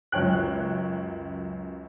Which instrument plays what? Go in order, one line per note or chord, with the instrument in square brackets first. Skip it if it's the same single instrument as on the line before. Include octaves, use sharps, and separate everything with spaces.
[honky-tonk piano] C#2 F#2 C#5 G5 F#6